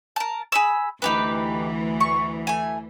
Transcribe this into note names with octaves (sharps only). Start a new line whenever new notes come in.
A#4 A5
G#4 B5 E6
D2 E3 D#4 G4 B4
C#6
A3 G#5